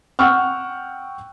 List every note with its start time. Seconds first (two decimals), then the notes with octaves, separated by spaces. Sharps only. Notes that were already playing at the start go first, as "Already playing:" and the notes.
0.19 F#5 G5 C#6 E6 F6